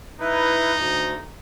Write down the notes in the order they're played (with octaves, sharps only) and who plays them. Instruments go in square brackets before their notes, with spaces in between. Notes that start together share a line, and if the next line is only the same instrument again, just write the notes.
[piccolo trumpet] D#4 [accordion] E4 B4
[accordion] D2